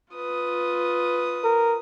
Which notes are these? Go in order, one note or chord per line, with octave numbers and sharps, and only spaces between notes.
F4 B4 D#6
A#4